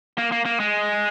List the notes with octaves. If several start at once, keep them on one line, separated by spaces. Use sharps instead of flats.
A#3
A#3
A#3
G#3